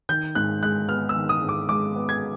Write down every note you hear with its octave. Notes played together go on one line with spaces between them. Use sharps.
D#3 G6
G#2 F#6
G#3 F#6
B3 F6
E6
D#3
D#6
G#2
D6
G#3 D6
B3
G#6